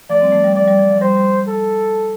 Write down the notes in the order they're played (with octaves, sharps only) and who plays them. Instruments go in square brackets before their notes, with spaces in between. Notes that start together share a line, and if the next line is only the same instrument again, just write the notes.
[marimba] F3 A3 [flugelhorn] D5
[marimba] G3 C4
F3 A3
G3
[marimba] F3 [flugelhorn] D5
[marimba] G3
F3
F3
[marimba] G3 [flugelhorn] C5
[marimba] G3
[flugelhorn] A4